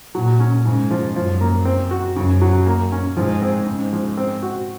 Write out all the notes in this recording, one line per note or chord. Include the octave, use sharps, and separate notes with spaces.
A#2 F#3
C#4
G#2 C#3
F3
F#2 F3
A#3
C4
F#4
F#2 C#3
F#3
A#3
C#4
G#2 F3
C4
G#2 C#3
F3
C4
F#4